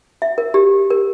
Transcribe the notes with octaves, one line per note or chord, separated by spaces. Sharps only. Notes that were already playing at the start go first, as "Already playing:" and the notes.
E5
A#4
G4
A#4